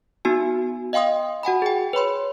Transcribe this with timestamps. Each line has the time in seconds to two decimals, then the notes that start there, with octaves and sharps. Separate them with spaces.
0.25 B3 D#4 F#4 G#5
0.93 D#5 F5 G5 C6 D#6
1.43 F#4 F#5 G#5 B5
1.62 G#4 G5
1.93 B4 C#5 B5 C6